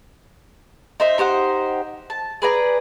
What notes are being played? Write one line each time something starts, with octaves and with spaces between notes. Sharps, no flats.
D#4 C5 E5
D#4 G4 C5 F#5
A5
G#4 B4 D5 A#5